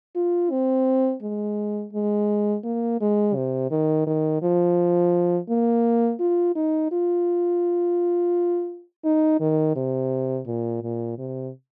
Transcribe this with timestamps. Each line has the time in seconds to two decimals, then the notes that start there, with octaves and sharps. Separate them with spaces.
0.16 F4
0.51 C4
1.22 G#3
1.93 G#3
2.64 A#3
3.01 G#3
3.35 C3
3.71 D#3
4.07 D#3
4.42 F3
5.49 A#3
6.20 F4
6.56 D#4
6.91 F4
9.05 D#4
9.40 D#3
9.76 C3
10.47 A#2
10.83 A#2
11.18 C3